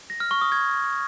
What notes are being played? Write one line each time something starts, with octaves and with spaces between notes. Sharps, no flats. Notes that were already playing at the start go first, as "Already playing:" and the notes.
A#6
F6
C#6
D#6
G#6